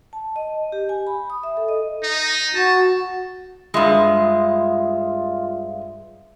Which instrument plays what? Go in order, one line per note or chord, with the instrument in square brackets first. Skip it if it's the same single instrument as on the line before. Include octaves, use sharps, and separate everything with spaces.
[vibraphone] A5
D#5
G4
G#5
B5
D#6
E5
A4
D#5
[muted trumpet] D#4
[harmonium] F#4 [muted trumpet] A5
[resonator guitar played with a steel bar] G2 G#3 [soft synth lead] F4 [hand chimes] E5 C6 D#6